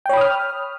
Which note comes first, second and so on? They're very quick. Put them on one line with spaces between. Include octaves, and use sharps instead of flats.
G5 C#5 B5 D#6 F6